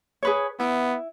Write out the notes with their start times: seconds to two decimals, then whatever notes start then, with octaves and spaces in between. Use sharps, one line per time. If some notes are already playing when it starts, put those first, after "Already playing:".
0.23 G#4 B4 C#5
0.60 B3 E4